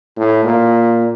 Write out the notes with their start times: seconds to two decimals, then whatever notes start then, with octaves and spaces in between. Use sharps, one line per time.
0.17 A2
0.45 A#2